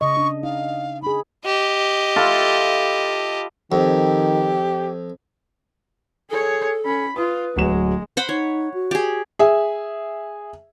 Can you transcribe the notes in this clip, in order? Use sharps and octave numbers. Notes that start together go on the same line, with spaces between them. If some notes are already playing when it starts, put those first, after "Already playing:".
C#3 D#5 C#6
D4
D#4 F5
D#4 G#4 B5
G4 D#5
E4 F4 A4
F2 D#3 G4
G#4 A4 C#5
C#4 B5
F4 B4 D#6
D1 F#3 G#3 E7
C5 F#5 B5
D#4 C#5
F#4
G4 G#4
G#4 E5